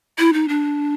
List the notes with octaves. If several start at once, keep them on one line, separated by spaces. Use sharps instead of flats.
E4
D#4
D4